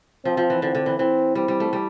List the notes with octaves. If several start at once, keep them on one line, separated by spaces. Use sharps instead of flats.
F3 C4
F3
E3
D3 C4
D3
E3
E3 C4
G3 C4
G3
A3
G3